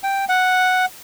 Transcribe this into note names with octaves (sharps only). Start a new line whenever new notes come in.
G5
F#5